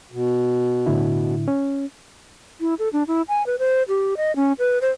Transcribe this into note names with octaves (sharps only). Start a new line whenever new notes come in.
B2
A2 D3 E4
C#4
E4
A4
D4
E4
G#5
B4
C5
G4
D#5
C#4
B4
C5